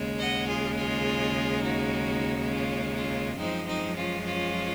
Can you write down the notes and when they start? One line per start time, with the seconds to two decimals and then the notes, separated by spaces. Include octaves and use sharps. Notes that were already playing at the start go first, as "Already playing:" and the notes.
Already playing: D#2 C#3 G#3
0.19 D#5 F#5
0.48 F4 G#4
0.77 F4 G#4
1.64 D#4 F#4
2.51 C#4 F4
2.95 C#4 F4
3.38 F#2 F3 G#3 C4 D#4
3.68 C4 D#4
3.96 C#4 F4
4.26 C#4 F4